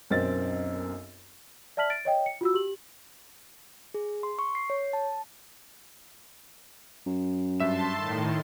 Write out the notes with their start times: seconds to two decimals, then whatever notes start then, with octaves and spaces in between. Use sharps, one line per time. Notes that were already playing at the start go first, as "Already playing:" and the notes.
0.10 B1 F#2 C4 A#4 A6
1.77 D5 E5 A5 F6 B6 F#7
1.90 A6 D7
2.05 C#5 D#5 G5
2.26 C#7
2.41 F4 F#4 E6
2.54 G4 F#7
3.94 G#4
4.23 C6
4.39 C#6
4.55 C7
4.70 C#5
4.93 A5
7.06 F#2
7.60 G2 E5 A5 C6 E7
7.94 A2 D#3